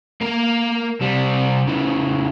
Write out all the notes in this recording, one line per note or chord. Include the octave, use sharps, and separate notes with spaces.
A#3 A#4
C3 G3
C#3 E3